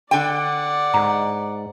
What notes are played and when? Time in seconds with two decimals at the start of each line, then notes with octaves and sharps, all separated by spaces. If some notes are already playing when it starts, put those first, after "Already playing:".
0.11 D3 D5 F#5 G5
0.94 G#2 A#5